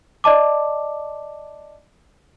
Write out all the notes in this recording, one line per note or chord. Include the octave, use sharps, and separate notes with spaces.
D5 D#5 A5 D6